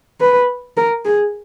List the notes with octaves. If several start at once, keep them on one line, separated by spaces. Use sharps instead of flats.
B4
A#4
G#4